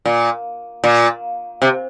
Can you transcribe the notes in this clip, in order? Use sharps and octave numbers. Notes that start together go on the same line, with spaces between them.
A#2
A#2
C3